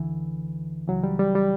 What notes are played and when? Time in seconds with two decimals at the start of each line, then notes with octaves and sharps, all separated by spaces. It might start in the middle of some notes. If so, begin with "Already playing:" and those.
Already playing: D2 D3 E3
0.88 C#2 C#3 E3 F#3
1.04 G3
1.19 G3
1.35 G3